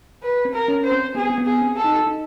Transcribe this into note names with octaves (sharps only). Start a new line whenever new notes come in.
B4
C4
A#4
C#4
C5
C4
B3 G#4
C4
B3
G#4
C4
A4
D#4
D#4